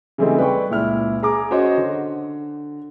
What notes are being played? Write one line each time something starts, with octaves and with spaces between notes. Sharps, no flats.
C#3 E3 G3 A3 C4 D#4
B4 D5 G5 C#6
C#2 A#2 E4 F6
G#4 A#5 D6
C#4 F#4 C5 C#5 D#5
D3